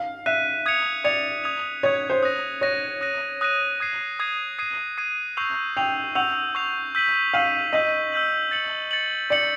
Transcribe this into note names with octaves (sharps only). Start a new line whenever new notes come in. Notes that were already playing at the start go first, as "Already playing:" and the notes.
Already playing: F5
E5 F#6 B6 D#7
D#6 G#6 C#7 F7
D5 D#6 G#6 C#7 F7
D#6 G#6 C#7 F7
C#5 D#6 G#6 C#7 F7
C5
D#6 F#6 A#6 D#7
C#5 D#6 F#6 A#6 D#7
D#6 F#6 A#6 D#7
D#6 F#6 A#6 D#7
D#6 G#6 C7 D#7
D#6 G#6 C7 D#7
D#6 G#6 C7 D#7
D#6 G#6 C7 D#7
C#6 E6 G6 C7 F7
G5 C#6 E6 G6 C7 F7
F#5 C#6 E6 G6 C7 F7
C#6 E6 G6 C7 F7
E6 G6 B6 D#7 F#7
F5 E6 G6 B6 D#7 F#7
D#5 E6 G6 B6 D#7 F#7
E6 G6 B6 D#7 F#7
A6 C#7 F#7
A6 C#7 F#7
D5 A6 C#7 F#7